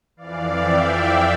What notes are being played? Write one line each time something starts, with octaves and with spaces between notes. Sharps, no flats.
F2 E3 D5 F5
E5 G5